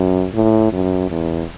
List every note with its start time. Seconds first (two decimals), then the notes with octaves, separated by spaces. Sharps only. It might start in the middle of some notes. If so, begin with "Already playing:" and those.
Already playing: F#2
0.34 A2
0.73 F#2
1.10 E2